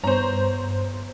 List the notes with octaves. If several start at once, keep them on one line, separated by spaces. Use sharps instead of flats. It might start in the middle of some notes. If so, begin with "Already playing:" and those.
G2 B3 C5 C#5 A#5